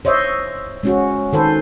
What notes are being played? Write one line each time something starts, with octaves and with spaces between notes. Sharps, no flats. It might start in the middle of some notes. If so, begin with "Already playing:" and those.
C5 C#5 D#5 E5
G#3 C#4 F#4
D#3 A4 B4 C5